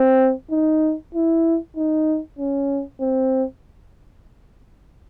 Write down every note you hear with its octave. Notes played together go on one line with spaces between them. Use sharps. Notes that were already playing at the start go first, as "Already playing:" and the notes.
Already playing: C4
D#4
E4
D#4
C#4
C4